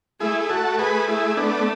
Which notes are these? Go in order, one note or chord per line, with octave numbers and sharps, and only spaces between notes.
A3 E4 G#4
G#4
F#4 A4
G#4 B4
E4 G#4
B3 D4